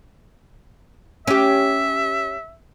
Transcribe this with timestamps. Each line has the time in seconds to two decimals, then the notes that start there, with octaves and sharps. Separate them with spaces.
1.27 C#4 G4 E5